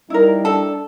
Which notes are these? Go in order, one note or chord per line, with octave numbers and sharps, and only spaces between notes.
G3 D#4 E4 A#4
D4 A4